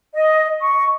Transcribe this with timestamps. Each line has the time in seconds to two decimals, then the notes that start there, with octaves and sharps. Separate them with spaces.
0.15 D#5
0.60 C#6